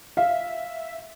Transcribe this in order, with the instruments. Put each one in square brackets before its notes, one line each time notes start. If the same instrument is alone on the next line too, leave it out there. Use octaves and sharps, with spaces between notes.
[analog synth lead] E5 [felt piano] F5